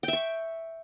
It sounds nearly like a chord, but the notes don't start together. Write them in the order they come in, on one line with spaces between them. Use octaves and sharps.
G5 E5 C#6